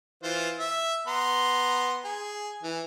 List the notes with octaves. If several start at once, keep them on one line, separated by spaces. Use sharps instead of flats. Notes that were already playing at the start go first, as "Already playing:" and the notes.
E3 F4 C5
E5
B3 A#5 C6
G#4
E3